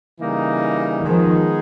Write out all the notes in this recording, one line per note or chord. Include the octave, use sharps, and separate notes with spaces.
C#3 E3 G3 A#3 D#4
D#3 F3 G#3 B3 D#4 G#4